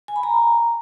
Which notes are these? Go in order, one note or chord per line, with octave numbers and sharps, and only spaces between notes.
G#5
B5
A#5